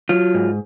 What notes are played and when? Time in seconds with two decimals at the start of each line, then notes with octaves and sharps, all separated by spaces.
0.09 F#3 F4
0.34 G#2